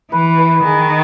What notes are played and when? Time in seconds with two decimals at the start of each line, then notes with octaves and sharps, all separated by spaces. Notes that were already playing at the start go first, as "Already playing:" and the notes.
0.12 E3 B4
0.38 B4
0.64 D#3 G#4